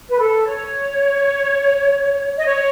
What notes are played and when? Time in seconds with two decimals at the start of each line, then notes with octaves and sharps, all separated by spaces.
0.09 B4
0.19 A4
0.47 C#5
2.38 D#5
2.47 C#5